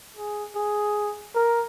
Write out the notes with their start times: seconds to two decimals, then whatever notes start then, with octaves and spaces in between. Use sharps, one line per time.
0.17 G#4
0.56 G#4
1.35 A#4